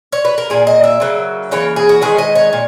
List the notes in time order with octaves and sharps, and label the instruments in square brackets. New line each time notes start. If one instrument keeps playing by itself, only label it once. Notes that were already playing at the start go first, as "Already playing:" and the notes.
[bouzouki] C#5
B4
A#4
A#2 A#3 G#4
D#5
E5
C#3 F#3 A#3
C#3 E3 A#3 C#5
G#4
F#4
D#3 G#3 B3 G#4
D#5
C#5
A#2